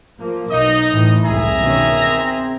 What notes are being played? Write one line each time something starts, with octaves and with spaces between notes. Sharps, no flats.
F3 A#3
B1 D#4 D#5
A2 E3
C2 F2 G#2 G#4 E5 A#5
B2 D#3 C#4
C4